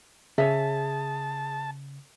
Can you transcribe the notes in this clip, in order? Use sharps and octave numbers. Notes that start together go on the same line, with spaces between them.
C#3 G#4 C#5 E5 A5